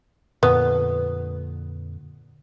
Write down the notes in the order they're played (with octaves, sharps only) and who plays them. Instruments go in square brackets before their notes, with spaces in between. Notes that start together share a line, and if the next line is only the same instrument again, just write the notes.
[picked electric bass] F2 A#2 D3 [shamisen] B3